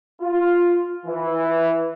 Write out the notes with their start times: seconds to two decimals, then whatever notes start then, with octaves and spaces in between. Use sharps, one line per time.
0.21 F4
1.06 E3